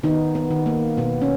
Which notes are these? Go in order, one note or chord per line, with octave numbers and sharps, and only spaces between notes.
D#3 B3 D#4
B3
D#3
A#3
B2 B3
C#4